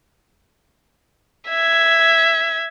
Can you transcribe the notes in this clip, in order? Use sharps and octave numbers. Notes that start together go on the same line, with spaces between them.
E5 G#6